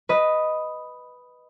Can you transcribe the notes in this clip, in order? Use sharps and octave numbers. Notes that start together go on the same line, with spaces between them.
B4 D#5